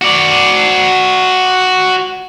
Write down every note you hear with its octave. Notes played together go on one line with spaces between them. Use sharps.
F#4 D5